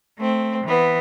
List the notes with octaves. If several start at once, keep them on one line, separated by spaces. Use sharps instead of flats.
A3 C4
E3 B3